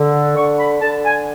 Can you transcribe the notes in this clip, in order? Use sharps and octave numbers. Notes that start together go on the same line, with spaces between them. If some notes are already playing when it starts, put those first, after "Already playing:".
Already playing: D3
D3 C#6
B5
D3 A5
G#5